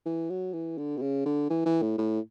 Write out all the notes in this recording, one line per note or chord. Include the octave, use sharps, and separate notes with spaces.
E3
F#3
E3
D3
B2
C#3
D3
E3
E3
A2
A2